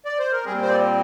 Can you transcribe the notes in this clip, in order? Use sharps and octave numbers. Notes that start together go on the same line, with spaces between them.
D5
C5
A#4
A#2 G3 C4 G#4
C5
D5